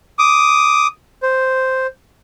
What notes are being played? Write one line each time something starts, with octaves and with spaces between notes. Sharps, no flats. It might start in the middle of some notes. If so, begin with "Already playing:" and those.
D6 D#6
C5